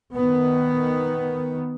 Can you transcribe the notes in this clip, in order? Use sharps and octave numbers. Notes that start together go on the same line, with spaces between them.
D#3 B3